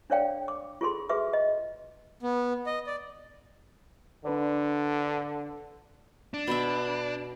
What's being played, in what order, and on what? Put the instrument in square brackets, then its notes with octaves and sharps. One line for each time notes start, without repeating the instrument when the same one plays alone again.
[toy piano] D4 A4 C#5 D5 F5 G5
D6
F4 G#4 A4 C6
F#4 G#4 B4 E5 D6
D#5
[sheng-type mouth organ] B3
D#5
D5
[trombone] D3 [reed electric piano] D4 B4 D5
[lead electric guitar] D4
[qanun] B2 E5 [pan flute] B5